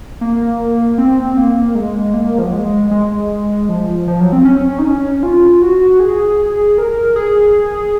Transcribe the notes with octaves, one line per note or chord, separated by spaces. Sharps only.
A#3
C4
A#3
G#3
A#3
F3
F#3
G#3
G#3
F3
F3
F#3
C4
C#4
D#4
C#4
F4
F#4
G#4
A#4
G#4